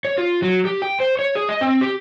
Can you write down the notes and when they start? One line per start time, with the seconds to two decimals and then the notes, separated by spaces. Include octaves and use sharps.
0.05 C#5
0.18 F4
0.42 F#3
0.65 G4
0.82 G5
1.00 C5
1.19 C#5
1.35 G#4
1.49 D#5
1.61 C4
1.81 G4